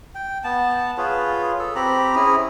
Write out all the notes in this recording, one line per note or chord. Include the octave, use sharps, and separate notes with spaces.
G5
B3 A5
F4 G#4 B4 C#5
A4
C4 G4 A#5 B5
C#4 E4 G#4